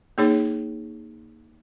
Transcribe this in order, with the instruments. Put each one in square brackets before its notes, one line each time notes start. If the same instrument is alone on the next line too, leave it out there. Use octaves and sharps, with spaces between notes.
[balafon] A#3 D#4 G#4 C#5